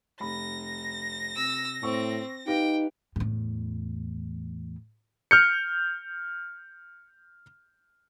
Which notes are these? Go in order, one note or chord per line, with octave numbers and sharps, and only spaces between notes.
F1 B5 A#6
C3 E6
A2 C4 C#6 E6
D#4 G4 B4 F5 G5
E2 A2
F6 G6 C#7